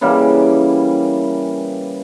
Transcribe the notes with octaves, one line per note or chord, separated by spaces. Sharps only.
C#3 E3 G3 A#3